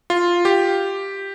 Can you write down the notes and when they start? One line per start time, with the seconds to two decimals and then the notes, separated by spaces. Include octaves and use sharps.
0.10 F4
0.45 G4